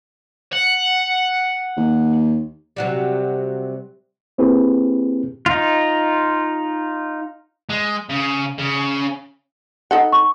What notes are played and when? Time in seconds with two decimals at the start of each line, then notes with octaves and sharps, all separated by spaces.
0.52 F#5
1.77 D#2
2.76 C3 F#3 G3
4.38 A#3 C4 E4 G4 G#4 B4
5.46 D#4 F4
7.70 G#3
8.09 C#3
8.59 C#3
9.91 D#4 A4 F#5
10.12 C#6